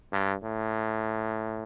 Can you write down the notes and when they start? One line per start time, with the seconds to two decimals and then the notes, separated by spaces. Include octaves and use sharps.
0.13 G2
0.43 A2